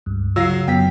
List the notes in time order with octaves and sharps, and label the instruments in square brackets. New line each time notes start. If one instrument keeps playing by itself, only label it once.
[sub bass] C#2 [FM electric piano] G2
[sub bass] C#3 [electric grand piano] F#3 F5 A#6 [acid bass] F4 [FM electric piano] E6 C7
[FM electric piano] F#2 F#3 B6 [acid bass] B3 [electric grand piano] G5